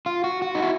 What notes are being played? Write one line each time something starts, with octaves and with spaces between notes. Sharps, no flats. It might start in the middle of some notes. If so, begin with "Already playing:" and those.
F4
F#4
F#4
D#4
E4